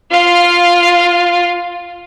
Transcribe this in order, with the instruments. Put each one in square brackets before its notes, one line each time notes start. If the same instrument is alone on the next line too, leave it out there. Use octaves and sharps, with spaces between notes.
[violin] F4 F5